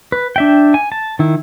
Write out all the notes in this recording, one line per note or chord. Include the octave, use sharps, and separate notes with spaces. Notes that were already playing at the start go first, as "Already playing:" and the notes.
B4
D4 E5 G5
G#5
A5
D#3 E4